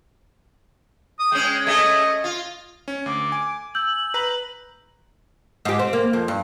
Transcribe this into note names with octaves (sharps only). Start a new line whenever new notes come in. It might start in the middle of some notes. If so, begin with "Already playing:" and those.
D#6
G#3 C#4 G5
A3 C#4 G#4 D#5
F4
C#4
D2 D6
G#5
E6 G6 F#7
B4 A#5
G#2 G4
C4
A#3
F2
G2